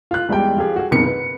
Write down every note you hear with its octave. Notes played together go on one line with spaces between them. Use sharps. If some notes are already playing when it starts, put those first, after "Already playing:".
F4 F#6
E2 G3 G#3 E4 G5
F3 F4 G4 G#4
F#4 G#4
F#1 C2 B2 D#3 C#7
B4